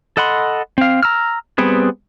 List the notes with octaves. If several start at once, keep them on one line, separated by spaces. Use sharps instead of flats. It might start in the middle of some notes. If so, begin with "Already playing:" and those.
A4 D#5 F#5 B5 C6
C4 F5
A#5 E6 F6
G3 B3 C4 G#4 B4